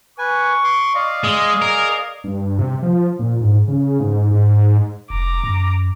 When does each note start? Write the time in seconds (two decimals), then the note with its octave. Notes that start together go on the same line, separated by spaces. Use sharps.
0.18 B4 G#5 C#6
0.64 C6 D6
0.95 D5 D#5 F5
1.24 G#3 D#6
1.62 G#4 A#4
2.24 G2
2.59 C3
2.83 F3
3.19 A#2
3.40 G#2
3.68 C#3
4.00 G#2
4.31 G#2
5.10 F1 A#5 D6
5.44 F#2